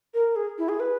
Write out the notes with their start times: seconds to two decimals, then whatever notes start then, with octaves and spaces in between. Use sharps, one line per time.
0.14 A#4
0.36 G#4
0.58 E4
0.69 G#4
0.80 B4